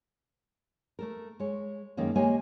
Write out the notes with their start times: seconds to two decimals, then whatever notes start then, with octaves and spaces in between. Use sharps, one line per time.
0.99 A3 A4 A#4
1.40 G#3 C#5
1.97 F#2 D#3 G#3 A#3 C#4
2.16 G#3 A#3 G4 C#5 G#5